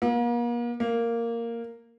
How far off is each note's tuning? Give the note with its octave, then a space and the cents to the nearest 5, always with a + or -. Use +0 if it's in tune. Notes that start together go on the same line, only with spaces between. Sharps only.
A#3 +40
A#3 -5